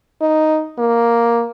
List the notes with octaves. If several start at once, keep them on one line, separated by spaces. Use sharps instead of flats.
D#4
A#3